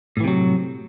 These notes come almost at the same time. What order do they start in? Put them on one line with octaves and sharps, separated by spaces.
A2 E3 C3 F#3